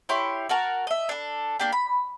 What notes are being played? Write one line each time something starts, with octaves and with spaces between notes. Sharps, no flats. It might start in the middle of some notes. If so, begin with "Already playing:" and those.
E4 G4 C#5 C6
F#4 A#4 A5
D#5 E5
D4 A4
A#3 D4 G4
B5